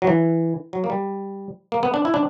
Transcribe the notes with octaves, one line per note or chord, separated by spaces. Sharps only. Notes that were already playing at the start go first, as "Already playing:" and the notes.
F#3
E3
F#3
A#3
G3
A#3
B3
D4
E4
D4